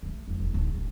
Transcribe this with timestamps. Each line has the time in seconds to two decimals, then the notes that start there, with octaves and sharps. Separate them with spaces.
0.03 A3 A#3
0.28 F2 G#2
0.40 E1 B1
0.53 D1 A2
0.75 D1 C#4